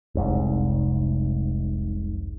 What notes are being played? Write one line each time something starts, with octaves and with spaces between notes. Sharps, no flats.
F1 C2 G#2